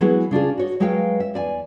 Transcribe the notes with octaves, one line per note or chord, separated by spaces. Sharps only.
E3 F#3 G#3 B3 E4 G#4
C#3 D4 F4 G#4
F#4 C#5 D#5
F#3 G#3 B4 C#5 F5 G5
E5
E2 D5 G#5